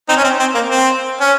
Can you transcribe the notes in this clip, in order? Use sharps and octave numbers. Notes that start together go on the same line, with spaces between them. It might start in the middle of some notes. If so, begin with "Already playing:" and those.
C4 D#4
C#4
C4
C4
A#3
C4
C#4